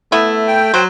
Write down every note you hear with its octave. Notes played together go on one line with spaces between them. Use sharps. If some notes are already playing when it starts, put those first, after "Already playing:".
A3 B3 E4
G5
F#3 C5